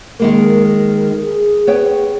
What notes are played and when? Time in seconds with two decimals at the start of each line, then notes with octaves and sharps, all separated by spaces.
0.20 D#3 G#3 A#3 A#4
0.68 A#4
1.20 G#4
1.67 B3 C#5 G5